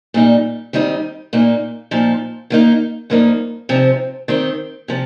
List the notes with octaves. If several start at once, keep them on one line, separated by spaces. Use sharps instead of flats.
A#2 G3 D#4
D#3 G3 C4 D#4
A#2 A#3 D#4
A#2 F3 D#4
D#3 A#3 D#4
G2 F3 A#3 D#4
C3 F3 C4 D#4
D#3 C4 D#4
C3 F3